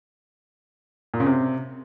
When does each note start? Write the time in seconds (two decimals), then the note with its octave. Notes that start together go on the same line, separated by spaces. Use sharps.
1.14 A#2
1.20 C#3
1.26 C3